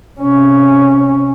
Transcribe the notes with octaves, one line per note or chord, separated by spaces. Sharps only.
C3 C#4